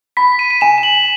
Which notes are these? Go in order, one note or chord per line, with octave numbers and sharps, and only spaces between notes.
B5 B6
D#7
D#7
G#5 E7
E7
F#7